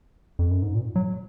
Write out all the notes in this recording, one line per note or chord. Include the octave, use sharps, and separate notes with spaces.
F2
F#2
G#2
A#2
F#3